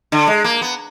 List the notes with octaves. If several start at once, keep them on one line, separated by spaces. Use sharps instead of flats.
D3
G#3
A#3
B3